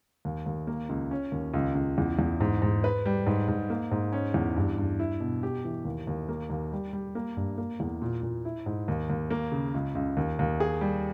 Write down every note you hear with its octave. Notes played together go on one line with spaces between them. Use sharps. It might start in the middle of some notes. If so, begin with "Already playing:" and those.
D#2
D#2
A#3
C#2
C#4
D#2
C#2
C#2
E2
E2
G#2
G#2
B4
G3
G#2
G#2
A#3
G#2
C#4
E2
G2
G2
E4
B2
G4
E3
D#2
D#2
A#3
D#2
G3
G3
A#3
G2
A#3
E2
A#2
A#2
E4
G#2
D#2
D#2
A#3
C#3
C#2
C#2
D#2
D#2
G#4
G3